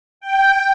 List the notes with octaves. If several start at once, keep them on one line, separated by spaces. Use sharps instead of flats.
G5